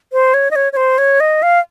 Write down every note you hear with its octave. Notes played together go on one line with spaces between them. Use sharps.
C5
C#5
D#5
C#5
C#5
C5
C#5
D#5
F5